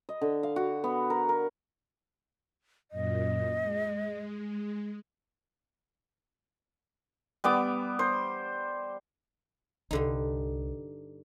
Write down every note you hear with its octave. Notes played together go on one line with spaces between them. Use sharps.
D#5
D3
F5
F#4
B3
A#4
A#4
F#2 A#2 D#5
G#3
G3 B3 D6
C5
C2 G2 D3 D#4